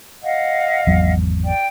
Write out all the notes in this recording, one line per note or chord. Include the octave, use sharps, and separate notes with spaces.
D#5 F5 F#5
G#1 E2 F#3
D5 G5